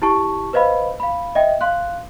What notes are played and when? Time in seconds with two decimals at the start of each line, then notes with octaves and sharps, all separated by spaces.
0.02 E4 G4 A5 C#6
0.53 B4 C5 D#5 F5 B5
1.00 F5 B5
1.35 D#5 E5 G5
1.61 F5 C6 F#6